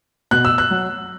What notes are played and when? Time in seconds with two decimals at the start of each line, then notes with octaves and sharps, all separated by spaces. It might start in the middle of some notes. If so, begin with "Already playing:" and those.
0.31 B2 F#6
0.45 E6
0.58 F#6
0.71 F#3